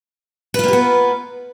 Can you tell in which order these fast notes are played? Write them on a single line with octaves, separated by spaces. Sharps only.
B4 F4 A#3 G4 B3